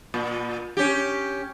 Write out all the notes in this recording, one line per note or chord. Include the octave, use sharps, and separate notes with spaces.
A#2
C#4 G4